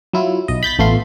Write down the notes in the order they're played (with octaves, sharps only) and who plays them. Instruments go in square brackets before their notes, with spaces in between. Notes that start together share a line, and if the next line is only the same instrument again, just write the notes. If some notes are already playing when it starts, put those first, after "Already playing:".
[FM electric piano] F#3 E4 F4
B1 D#5
B5 G6 A6 B6
A1 A3 B3 F4 C6